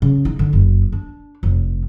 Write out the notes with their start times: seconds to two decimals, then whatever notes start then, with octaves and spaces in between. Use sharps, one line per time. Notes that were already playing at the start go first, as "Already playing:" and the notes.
0.02 C#3
0.25 D#4
0.39 D3
0.53 F#1
0.92 D4
1.43 F1